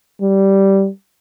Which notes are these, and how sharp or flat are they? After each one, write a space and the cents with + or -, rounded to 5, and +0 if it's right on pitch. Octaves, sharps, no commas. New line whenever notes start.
G3 -10